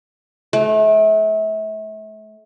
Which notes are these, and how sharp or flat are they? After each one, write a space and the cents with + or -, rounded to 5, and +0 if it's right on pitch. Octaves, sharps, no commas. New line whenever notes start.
A3 -35